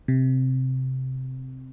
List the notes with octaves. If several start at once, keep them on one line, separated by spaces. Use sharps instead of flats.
C3